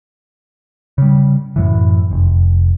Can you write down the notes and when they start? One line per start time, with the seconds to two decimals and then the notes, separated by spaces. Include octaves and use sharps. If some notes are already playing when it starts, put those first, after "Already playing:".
0.98 C#3 G3
1.56 F#2 A2 E3
2.11 F1